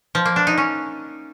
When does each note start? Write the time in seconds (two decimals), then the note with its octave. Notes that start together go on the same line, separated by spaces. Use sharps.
0.15 F3
0.25 A#3
0.36 D4
0.47 D#4
0.58 C#4